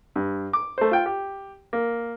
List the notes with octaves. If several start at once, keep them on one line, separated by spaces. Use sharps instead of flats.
G2
D6
A3 C5
F4 G5
G4
A#3